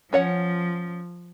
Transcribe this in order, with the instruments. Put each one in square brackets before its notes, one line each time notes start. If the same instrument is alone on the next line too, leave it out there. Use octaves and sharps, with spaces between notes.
[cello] F3 [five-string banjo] C#4 C#5 F#5